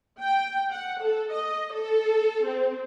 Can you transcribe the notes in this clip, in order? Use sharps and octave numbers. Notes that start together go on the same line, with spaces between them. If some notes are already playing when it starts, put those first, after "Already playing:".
G5
F#5
A4
D#5
A4
C4